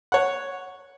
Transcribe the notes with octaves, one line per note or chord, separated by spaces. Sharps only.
C#5 F#5